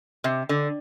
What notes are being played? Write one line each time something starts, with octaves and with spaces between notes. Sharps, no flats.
C3
D3